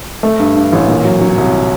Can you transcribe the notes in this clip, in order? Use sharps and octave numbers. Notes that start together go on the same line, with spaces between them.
A3
G2
G2
A1
A#2
F#3
F#3
C2